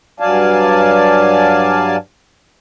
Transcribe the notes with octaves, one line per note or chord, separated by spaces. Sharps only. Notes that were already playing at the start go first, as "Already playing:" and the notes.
G2 F#3 D5 F5 G#5 A5